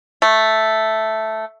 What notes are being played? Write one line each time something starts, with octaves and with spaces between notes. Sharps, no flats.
A3